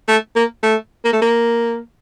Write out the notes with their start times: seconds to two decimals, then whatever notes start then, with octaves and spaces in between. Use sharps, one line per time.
0.08 A3
0.36 A#3
0.63 A3
1.04 A#3
1.13 A3
1.22 A#3